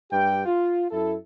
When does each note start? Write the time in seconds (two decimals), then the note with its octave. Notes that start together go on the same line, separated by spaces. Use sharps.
0.12 G2 G4 G5
0.46 F4
0.91 F#2 E4 A4